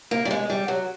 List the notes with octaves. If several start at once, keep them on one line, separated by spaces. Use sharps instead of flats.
A#3
G3
G#3
G3
F#3